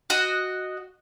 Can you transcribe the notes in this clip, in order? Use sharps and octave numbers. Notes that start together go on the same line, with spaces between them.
F#4 D#5